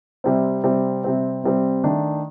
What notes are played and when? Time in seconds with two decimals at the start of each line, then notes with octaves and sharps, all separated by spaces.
0.24 C3 G3 C4
0.64 C3 G3 C4
1.04 C3 G3 C4
1.43 C3 G3 C4
1.84 D#3 A3 D4